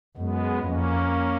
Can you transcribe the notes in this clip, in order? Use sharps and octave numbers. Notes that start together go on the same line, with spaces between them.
F#2 G#3 B3
F2 A#3 C#4